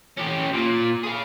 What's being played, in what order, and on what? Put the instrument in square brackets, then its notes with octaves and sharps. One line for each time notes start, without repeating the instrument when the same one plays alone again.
[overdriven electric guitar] C#4 G4
A#2
G#4 F5